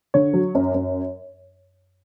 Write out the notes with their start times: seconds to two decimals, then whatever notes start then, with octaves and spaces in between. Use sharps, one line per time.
0.14 D3 C#5
0.34 F#3
0.55 F#2
0.74 F#2